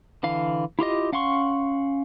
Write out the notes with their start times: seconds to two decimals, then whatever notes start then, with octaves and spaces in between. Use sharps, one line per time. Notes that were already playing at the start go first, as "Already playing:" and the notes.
0.23 D3 E3 F5
0.79 E4 F4 G4 D#5
1.12 C#4 F5 F#5 C6 C#6